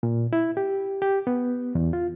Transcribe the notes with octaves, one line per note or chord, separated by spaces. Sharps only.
A#2
E4
G4
G4
B3
E2
F4